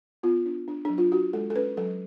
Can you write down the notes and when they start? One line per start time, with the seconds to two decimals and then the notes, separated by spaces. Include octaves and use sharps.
0.23 B3 F4
0.46 D4
0.68 D4
0.85 F#3 D4
0.98 F4
1.12 D4 F#4
1.33 G#3 A4
1.50 A4
1.55 C#4 B4
1.77 F#3 A4